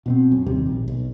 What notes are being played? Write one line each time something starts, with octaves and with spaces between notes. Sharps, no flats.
B2 B3 C4
F#2
G#1 D#2 C3 G3
A#1
B1